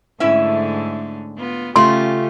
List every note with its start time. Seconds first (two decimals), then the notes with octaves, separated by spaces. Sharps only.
0.20 G#2 D3 A3 C#4 E4 E5
1.38 B3 F4
1.76 C#3 A3 C#4 F4 G4 C6